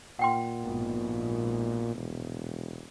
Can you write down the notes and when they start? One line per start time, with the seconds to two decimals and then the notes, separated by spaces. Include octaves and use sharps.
0.19 A#2 F#5 G5 C6
0.60 A#1 G#2 B2
1.95 E1